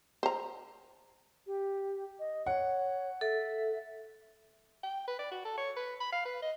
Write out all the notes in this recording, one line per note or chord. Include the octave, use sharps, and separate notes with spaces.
C5 A#5
G4
D#5
C#5 F#5
A4 E5
G5
B4
D5
F#4
A4
C#5
B4
B5
F5
B4
D#5